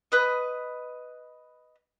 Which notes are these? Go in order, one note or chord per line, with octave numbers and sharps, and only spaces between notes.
B4 D#5